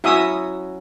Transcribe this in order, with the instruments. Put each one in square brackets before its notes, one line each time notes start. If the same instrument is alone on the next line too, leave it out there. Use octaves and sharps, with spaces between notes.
[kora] F#3 C#4 F#4 [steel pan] E4 E5 D#6